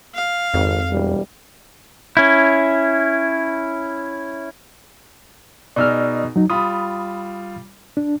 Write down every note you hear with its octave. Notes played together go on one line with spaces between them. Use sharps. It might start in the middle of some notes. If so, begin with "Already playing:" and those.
F5
G#1 F2
E1 G3
C#4 E4
B2 D#4 G#4 D5 E6 F6
F#3 D#4
G3 F4 B5 D#6
D4